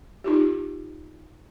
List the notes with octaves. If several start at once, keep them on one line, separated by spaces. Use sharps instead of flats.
D#4 F4 G4